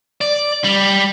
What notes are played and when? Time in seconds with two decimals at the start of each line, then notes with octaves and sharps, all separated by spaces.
0.21 D5
0.64 G3